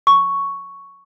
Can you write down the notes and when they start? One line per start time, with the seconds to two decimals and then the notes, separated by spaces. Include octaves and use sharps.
0.07 C#6